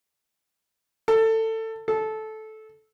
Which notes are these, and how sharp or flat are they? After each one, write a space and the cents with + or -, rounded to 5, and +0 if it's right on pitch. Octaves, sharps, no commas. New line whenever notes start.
A4 +20
A4 -15